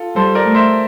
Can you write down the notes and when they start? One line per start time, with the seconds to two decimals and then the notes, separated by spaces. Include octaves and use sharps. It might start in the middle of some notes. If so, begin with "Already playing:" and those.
Already playing: F4 A4
0.15 G3 A4 C5
0.35 A#4 D5
0.45 A3
0.54 C5 E5